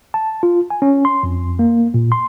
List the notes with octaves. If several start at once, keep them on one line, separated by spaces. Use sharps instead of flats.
A5
F4
G#5
C#4
C6
F2
A#3
A#2
C6